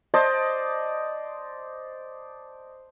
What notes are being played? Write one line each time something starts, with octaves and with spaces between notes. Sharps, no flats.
C5 D5 D#5 A5